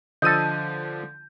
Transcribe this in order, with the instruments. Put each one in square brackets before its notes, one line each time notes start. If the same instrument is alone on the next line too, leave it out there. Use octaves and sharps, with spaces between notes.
[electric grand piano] D3 F3 D#7 [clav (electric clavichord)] A4 D#5 [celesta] G6